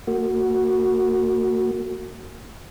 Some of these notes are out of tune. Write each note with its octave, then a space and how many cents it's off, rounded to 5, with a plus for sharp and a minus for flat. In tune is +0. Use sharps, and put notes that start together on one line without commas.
A#3 -35 F#4 +0